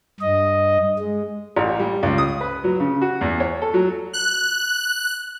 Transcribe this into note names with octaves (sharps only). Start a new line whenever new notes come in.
G2 D#5
G#3
A1
G3
C#2
D#6
B4
F#3
C#3
F#4
E2
C#5
A4
F#3
F#6